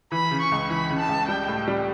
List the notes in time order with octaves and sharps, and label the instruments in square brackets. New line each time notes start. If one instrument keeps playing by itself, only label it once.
[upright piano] E3 [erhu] B5
[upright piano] C#3
[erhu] C#6
[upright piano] C#2
[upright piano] E3 [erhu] B5
[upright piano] C#3
[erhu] A5
[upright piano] C#2
[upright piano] G3 [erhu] G5
[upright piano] A2
G3